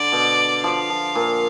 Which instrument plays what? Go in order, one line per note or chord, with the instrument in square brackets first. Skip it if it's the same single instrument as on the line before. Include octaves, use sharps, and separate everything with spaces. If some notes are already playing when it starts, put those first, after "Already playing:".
Already playing: [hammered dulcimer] D3 [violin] D5
[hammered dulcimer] B2
[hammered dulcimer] F3 [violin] F5
[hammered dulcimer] F3
A#2